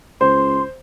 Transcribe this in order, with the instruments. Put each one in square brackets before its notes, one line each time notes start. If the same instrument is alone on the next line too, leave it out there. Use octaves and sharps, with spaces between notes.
[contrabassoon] C#2 [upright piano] C5 [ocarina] C6